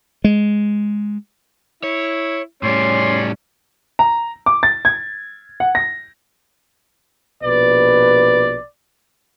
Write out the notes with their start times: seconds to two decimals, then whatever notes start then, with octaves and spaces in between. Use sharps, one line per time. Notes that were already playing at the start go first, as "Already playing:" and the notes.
0.24 G#3
1.83 E4 C#5
2.63 A2 G3 C#4 C#5 D5 C6
3.99 A#5
4.46 D6
4.63 A6
4.85 G#6
5.60 F#5
5.75 A#6
7.43 A#1 B2 B4 D5